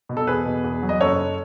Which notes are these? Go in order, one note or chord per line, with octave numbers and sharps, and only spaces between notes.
B2
A4
E2 G#4 B4
B2
E2
F#3
D#5
F#1 A4 C#5
F#1